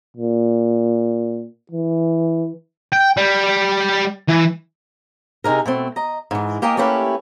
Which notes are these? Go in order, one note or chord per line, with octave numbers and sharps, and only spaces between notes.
A#2
E3
G5
G3
E3
C3 D#4 G#4 A#4
B2 A3 C4
D#5 A#5
G#2 E3
A#3 G4 A#4 D#5 G#5
A3 A#3 C#4 E4 G4 B4